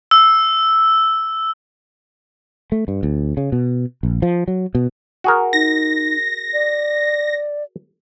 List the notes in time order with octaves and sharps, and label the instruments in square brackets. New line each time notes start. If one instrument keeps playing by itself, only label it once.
[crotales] E6
[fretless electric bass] A3
G2
D2
C#3
B2
A#1
F3
F#3
B2
[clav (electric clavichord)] F#4 G#4 A#4
[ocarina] D#4 [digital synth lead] A#6
[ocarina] D5